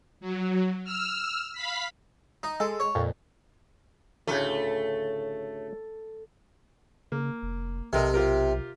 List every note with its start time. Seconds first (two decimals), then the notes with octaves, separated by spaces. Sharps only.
0.21 F#3
0.84 E6 F6
1.53 F5 B5 B6
2.43 D#4
2.60 G#3 A4
2.80 C#5
2.95 F2 A#2
4.27 D2 A2 C#3 A3
7.12 C#3 A#3
7.43 F1
7.93 B1 C3 A4 A#4 D#5
8.14 F4 G4 A#4